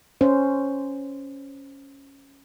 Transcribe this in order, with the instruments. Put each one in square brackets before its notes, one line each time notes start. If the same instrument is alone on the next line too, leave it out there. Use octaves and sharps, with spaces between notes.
[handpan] C#4 C5